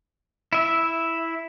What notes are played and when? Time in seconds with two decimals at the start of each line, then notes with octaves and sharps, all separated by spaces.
0.53 E4 E5